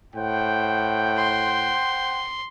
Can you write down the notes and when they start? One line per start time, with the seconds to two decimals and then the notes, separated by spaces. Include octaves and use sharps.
0.14 A2 C5 F#5 G5
1.18 C6